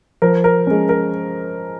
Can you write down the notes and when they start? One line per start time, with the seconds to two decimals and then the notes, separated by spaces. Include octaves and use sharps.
0.22 F3 A#4
0.44 A#4
0.67 G#3 C#4
0.89 A#4